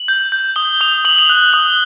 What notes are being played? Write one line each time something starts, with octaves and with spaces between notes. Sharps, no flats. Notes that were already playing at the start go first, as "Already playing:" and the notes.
Already playing: F#7
G6
G6
D#6 G7
D#6 F7
D#6 F#7
F7
F#6 F#7
D#6 G7